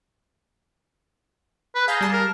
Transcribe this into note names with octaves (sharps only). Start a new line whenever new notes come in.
B4
G#4 F5 A#5 G6
G3 A5
A#4